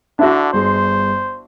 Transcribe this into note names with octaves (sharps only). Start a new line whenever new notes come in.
D3 D4 E4 F#4 E5
G1 G#4 C5 C6